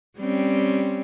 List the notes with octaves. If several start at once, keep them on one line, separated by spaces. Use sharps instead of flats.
G3 C4 C#4